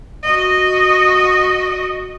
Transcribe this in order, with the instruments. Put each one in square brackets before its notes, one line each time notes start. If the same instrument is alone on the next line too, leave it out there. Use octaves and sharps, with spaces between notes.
[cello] F#4 D#5